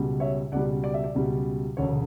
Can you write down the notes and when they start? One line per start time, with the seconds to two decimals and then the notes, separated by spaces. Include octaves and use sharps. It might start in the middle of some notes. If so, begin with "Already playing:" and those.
Already playing: C#2 B2 G3
0.20 C#5 E5
0.52 C#2 B2 G3 D5 F#5
0.84 D5
0.94 E5
1.04 D5
1.15 C#2 B2 G3
1.77 E1 D2 C#3 C#5